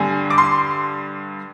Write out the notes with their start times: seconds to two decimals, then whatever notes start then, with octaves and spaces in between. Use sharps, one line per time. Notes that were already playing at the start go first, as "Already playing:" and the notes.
Already playing: G2 D3 G#5
0.30 D6
0.38 C6